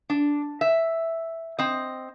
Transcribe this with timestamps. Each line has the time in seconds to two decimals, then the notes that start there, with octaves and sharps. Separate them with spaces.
0.10 D4
0.61 E5
1.59 C4 D#5